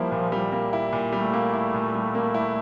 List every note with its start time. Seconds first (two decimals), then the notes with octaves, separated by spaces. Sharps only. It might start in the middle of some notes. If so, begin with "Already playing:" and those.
Already playing: F3 G3 A#3 E4
0.12 A#2
0.32 G3
0.52 A#3
0.73 E4
0.93 A#2
1.13 G3 A3
1.33 A#3
1.54 E4
1.74 A#2
1.94 G3
2.15 A#3
2.34 E4